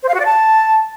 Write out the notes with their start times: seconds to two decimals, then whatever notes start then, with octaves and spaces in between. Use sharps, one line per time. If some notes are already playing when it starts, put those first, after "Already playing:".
0.03 C5
0.08 F5
0.14 F#4
0.20 D5
0.25 A5